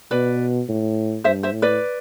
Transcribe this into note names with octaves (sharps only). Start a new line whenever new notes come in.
B2 B4 D5
A2
G2 C5 E5
C5 E5
A2
B4 D5